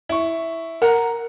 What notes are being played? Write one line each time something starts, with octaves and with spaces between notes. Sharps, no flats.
E4 C#6
A#4 F#5 A#5